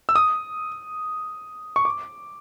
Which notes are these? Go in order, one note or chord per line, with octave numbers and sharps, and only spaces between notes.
E6
D#6
C#6
D6